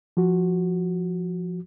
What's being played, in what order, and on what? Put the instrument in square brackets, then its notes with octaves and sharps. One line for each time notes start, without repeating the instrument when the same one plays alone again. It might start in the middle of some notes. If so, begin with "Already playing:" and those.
[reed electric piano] F3 F#4